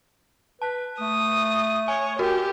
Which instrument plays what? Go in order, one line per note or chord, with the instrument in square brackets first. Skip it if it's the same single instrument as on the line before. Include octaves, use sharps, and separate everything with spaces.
[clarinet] B4 [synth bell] A5
[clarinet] A3 [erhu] D#6
[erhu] C#5 [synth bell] G#5
[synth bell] F#4 A#4 [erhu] G4